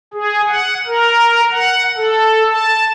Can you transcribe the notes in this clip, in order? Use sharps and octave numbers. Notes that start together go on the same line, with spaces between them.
G#4
F#5
A#4
F#5
A4
A5